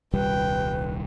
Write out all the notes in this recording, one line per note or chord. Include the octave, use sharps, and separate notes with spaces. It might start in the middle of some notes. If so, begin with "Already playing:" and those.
D#1 C2 G3 B4 G5